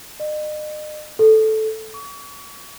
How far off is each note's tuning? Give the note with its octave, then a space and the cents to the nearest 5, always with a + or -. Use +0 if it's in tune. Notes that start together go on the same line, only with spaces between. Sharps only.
D#5 -40
A4 -10
C#6 +40